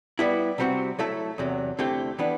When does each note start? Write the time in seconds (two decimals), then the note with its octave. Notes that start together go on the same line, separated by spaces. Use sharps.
0.19 G3 B3 E4 G4
0.58 C3 G3 C4 F#4
0.99 F#3 A3 E4 A4 E5
1.38 E2 C3 F#3
1.79 D3 A3 C4 E4 G4
2.19 E3 B3 D4